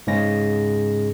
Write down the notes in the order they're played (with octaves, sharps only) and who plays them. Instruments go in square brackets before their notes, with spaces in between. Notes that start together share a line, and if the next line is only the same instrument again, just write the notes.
[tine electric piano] G#2 C#3 G#3 C#4 A#6